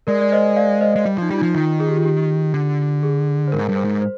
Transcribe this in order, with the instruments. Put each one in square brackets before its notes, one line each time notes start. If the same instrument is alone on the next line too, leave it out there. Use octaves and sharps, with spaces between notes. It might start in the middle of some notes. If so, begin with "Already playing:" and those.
[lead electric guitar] G#3 [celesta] A#4 D5
[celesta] D5
C5 D#5
D5 F5
C5 D#5
[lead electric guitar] G#3
G3
[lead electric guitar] F3 [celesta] D#4
[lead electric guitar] G3 [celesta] F4
[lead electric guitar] F3 [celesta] D#4
[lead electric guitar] D#3 [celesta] F4
[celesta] G#4
G4
F4
G4
[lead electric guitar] D3
[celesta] G#4
C5
[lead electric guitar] G#2 [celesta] A#4
[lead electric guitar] G2
[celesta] C5
[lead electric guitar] G#2
[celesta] C5